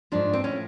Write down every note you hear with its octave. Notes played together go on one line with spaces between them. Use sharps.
G#2 F3 D4
C4
A2 F3 C#4